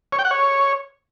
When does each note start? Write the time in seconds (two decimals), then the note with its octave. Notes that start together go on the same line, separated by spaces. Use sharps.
0.12 C#5
0.19 G5
0.25 F#5
0.31 C#5